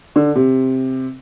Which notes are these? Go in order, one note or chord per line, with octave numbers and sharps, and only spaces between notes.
D3
C3